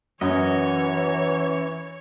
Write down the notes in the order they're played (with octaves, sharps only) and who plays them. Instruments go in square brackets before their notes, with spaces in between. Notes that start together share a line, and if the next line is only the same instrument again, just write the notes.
[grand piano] F#2 [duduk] E3 [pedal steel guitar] C#4 F#4 D#5 [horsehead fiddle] C#5